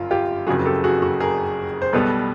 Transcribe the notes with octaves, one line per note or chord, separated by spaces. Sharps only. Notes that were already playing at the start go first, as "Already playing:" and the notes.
Already playing: G1 F#2 F4
F4 G4
F#1 F2 C#3 F#3 F#4 G#4
G4 A4
F#4 G#4
F#4
G#4 A#4
C5
B1 B2 G3 B3 A4 B4